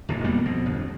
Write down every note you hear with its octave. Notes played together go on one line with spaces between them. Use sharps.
D1 D#2 A#2
F2 G3 A#3 B3
F2 B2
G1 F2